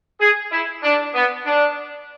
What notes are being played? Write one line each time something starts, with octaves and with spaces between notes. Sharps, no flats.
G#4
E4
D4
B3
D4